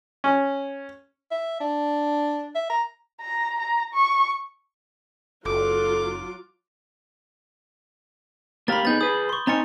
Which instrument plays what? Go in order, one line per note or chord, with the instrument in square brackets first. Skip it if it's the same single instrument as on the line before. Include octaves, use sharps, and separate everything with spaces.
[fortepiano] C#4
[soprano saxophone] E5
D4
E5
A#5
[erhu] A#5
A#5
C#6
[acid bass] F#1 [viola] F#3 F4 [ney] A4 [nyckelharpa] D6
[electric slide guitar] A#3 G4 F5 [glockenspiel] B5 A6
[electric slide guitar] B3 D#4 G#4 [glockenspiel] G6 A6
[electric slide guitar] G#4 B4 [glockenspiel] D#6
[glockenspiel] C6 C#6
[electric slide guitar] C4 D#4 G#5 [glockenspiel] A#5 A6 C#7